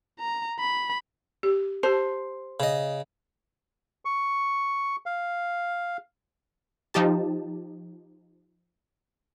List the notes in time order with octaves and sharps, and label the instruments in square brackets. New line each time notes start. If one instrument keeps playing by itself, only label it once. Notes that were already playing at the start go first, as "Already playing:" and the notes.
[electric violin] A#5
B5
[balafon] G4
[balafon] G4 A5 [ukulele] C5
[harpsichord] C#3 D#5
[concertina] C#6
F5
[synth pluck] F3 D#4 G4 A5